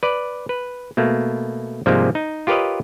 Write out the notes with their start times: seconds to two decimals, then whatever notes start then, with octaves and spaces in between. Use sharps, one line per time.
0.03 B4 D5
0.49 B4
0.97 B2 A3 A#3
1.86 G#2 C3 F3 G3 G#3 A#3
2.15 D#4
2.47 F4 G4 A#4 B4 C#5 D#5